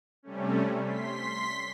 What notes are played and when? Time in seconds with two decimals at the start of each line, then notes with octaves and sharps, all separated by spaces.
0.23 C3 G3 A3 C#4
0.83 C6 B6